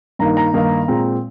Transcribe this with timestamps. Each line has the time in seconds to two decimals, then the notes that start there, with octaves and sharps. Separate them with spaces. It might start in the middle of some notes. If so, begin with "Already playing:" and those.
0.19 G2 D#3 A#3 D#4 A#5
0.37 A#5
0.53 G2 D#3 A#3 D#4
0.88 A#2 G#3 C4